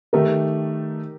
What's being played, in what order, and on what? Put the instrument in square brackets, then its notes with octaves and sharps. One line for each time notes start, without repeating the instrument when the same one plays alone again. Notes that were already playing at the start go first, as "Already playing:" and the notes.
[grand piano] D#3 A3 D#4 A4 [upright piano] G4 A#4